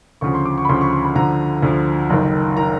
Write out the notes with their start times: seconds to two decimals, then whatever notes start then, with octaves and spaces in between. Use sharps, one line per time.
0.21 D2 C#3 F3 C#6
0.34 C6
0.46 D6
0.58 C#6
0.65 B5
0.69 D2 C#3 F3 C6
0.81 C#6
0.93 C6
1.05 B5
1.15 D2 D3 F3 A#5
1.62 D2 D3 F3
2.10 F#1 F#2 D#3
2.57 D#3 A#5